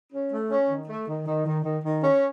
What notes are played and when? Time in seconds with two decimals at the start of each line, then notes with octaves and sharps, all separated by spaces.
0.12 C#4
0.32 A3
0.50 C#4
0.70 D#3
0.88 A3
1.08 D#3
1.27 D#3
1.46 D#3
1.64 D#3
1.84 D#3
2.03 C#4